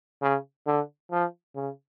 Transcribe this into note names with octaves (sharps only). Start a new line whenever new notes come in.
C#3
D3
F3
C#3